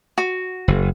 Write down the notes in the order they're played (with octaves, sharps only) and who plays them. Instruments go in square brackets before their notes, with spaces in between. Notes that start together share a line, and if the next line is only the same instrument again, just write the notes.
[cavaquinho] F#4
[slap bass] F#1